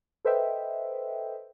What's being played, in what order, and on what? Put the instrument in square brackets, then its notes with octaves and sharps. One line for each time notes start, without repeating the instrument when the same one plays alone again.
[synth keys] A4 B4 C5 D#5 E5 G5